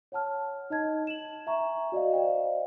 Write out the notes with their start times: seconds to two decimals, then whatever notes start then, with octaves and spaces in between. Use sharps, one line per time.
0.12 C#5 F#5 A5 F6
0.70 D#4 D#5 A5 G#6
1.07 E7 F#7
1.47 E5 G#5 A#5 C#6
1.92 F#4 D5 D#5 F5
2.13 C5 D5 D#5 F5 G5